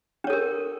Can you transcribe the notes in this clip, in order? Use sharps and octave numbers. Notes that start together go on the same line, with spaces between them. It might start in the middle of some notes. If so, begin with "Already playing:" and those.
D4 A4 A#4 C#5